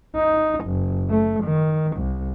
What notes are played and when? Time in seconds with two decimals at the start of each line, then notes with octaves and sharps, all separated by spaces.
0.16 D#4
0.66 F#1
1.10 A3
1.44 D#3
1.97 C2